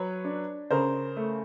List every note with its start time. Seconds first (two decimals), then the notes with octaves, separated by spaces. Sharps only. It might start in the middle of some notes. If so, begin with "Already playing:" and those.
Already playing: F#3 B4 C#5
0.25 D4
0.71 C#3 A#4 C5
1.17 A3